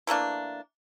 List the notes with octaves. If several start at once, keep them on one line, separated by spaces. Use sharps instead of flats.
E3 A3 A#3 D4